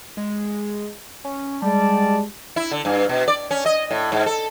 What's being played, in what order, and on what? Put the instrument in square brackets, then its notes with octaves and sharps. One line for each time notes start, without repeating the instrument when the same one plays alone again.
[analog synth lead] G#3
C#4
[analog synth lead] G3 [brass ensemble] G#3 D5 A5
[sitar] E4
D3
G2
B2
D5
C#4
D#5
A2
G#2
A4